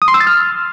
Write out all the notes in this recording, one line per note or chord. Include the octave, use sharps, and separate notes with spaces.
D#6
C6
E6
A6
F6